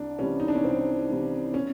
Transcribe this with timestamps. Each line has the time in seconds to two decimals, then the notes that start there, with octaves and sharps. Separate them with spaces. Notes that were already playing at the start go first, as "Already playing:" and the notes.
Already playing: C2 D4
0.18 C3 E3 G3 C#4
0.40 D#4
0.48 D4
0.55 C#4
0.64 C2 C4
1.09 C3 E3 G3
1.54 C#4